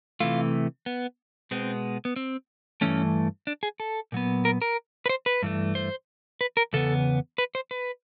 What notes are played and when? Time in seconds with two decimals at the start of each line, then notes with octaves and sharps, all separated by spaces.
0.20 C3 E3 A3 F4
0.86 B3
1.51 B2 G#3 B3 C4
2.05 B3
2.16 C4
2.81 G2 E3 A3 C#4
3.47 D4
3.63 G#4
3.80 A4
4.12 A#2 F#3 B3
4.45 A#4
4.62 A#4
5.06 B4
5.09 C5
5.26 B4
5.42 G2 E3 A3
5.75 C5
6.41 B4
6.57 A#4
6.73 E2 C#3 B3 A4
7.38 B4
7.55 C5
7.71 B4